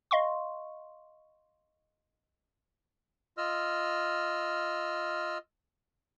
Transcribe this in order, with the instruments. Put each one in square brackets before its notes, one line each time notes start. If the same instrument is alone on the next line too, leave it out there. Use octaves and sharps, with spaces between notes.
[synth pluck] D#5 F5 C6 C#6
[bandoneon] F4 D#5 E6 F6